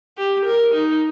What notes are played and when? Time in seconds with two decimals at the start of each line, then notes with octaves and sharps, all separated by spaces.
0.18 G4
0.46 A#4
0.74 D#4